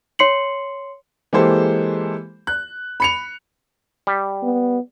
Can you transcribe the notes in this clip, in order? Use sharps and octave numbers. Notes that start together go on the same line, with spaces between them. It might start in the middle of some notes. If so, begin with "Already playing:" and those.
C#5 C6 C7 C#7 F#7
E3 G#3 A#3 G4 A4 C5
F#6
B5 C#7 F7
G3
B3